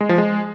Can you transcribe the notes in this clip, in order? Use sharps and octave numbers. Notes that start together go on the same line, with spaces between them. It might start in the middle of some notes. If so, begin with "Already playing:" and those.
G#3
F3
G#3